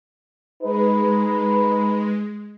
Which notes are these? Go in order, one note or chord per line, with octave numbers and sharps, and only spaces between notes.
G#3 D#4 G#4 B4